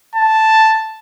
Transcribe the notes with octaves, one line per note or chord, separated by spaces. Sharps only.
A5